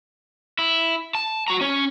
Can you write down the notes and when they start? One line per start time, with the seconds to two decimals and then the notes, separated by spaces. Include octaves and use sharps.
0.59 E4
1.15 A5
1.48 F#4 A#5
1.61 C#4 C#5